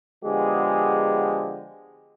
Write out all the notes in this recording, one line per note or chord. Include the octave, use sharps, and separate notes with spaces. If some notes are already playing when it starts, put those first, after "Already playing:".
D3 F3 G#3 B3 G4 G#4